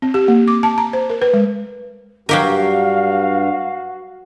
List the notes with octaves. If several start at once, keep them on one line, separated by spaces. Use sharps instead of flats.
C4
G4
A#3
D6
A5
A#5
C5
A#4
B4
G#3
G2 F#3 F#4 G4 A#4 F5